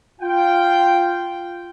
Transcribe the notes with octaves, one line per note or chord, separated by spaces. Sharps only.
F4 G5